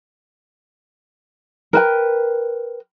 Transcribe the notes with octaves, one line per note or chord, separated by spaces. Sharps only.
A#4 B4 G5